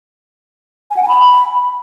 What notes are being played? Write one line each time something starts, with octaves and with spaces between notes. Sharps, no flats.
G#5
F#5
G#5
B5